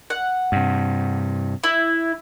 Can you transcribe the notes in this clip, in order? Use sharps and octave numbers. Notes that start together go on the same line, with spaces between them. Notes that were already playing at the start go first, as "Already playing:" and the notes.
F#5
G2 C3
E4